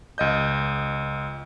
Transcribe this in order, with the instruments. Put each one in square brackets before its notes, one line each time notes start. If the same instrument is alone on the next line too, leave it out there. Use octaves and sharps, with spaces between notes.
[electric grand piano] C#2 D#5 G6